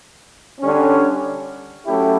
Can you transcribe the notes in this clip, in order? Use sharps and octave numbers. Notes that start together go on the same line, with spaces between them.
D3 G3 C#4
F#3 A3 C#4 E4 G4